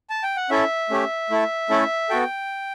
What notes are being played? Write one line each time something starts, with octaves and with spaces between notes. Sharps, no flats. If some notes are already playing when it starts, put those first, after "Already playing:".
A5
G5
F#5
C#4 E4 A4 E5
A3 C#4 G4
A3 E4 A4
A3 C#4 E4 A4
B3 F#4 A4 G5